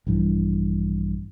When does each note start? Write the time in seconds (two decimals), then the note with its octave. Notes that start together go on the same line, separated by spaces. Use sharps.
0.07 A#1 G2 E3